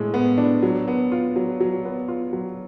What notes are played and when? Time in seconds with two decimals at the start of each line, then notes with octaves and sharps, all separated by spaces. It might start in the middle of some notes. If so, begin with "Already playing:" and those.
Already playing: A2 G#3
0.14 B3
0.38 D4
0.63 F#3
0.88 B3
1.12 F4
1.36 F#3
1.61 F#3
1.85 B3
2.08 F4
2.33 F#3